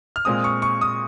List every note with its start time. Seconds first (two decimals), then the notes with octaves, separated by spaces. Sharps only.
0.16 F6
0.25 A#2 G#3 C4 D#6
0.44 C#6
0.62 C#6
0.81 D#6